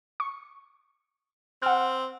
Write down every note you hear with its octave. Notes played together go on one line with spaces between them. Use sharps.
C#6
C4 F#5 F6